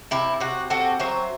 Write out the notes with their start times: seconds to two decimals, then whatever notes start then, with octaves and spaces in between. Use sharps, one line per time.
0.11 C3 E4
0.40 C3 F#4
0.70 C4 F#4 A4
1.00 F#3 C5 E5